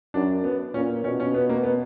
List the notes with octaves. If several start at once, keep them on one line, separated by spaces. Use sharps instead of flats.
F#2 D4
B3
A#2 C#4
B2 C#4
C#4
B3
A#3
B3